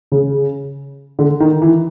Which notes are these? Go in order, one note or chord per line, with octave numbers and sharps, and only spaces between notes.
C#3
D3
D#3
E3